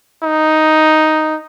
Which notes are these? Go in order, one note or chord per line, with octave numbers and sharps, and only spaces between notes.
D#4